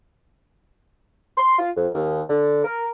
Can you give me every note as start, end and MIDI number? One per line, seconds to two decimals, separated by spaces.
1.37 1.55 84
1.59 1.70 65
1.77 1.88 41
1.94 2.22 39
2.30 2.60 50
2.65 2.89 70